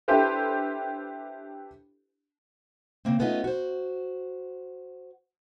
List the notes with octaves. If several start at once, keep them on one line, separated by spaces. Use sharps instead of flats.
D4 E4 G4 A4 B4 C5
C#3 A#3 C4
A3 B3 C#4 D#4 F4
F#4 C5